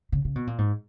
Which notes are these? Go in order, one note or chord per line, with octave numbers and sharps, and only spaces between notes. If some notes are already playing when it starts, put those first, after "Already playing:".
C#3
C#3
B2
A#2
G#2